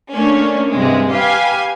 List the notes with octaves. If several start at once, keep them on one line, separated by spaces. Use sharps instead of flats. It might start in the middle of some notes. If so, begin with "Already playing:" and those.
A3 A#3 C#4 D4
G2 C3 G#3 C4
G4 B4 F5 G#5